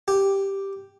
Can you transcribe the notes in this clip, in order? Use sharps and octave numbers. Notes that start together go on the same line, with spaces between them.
G4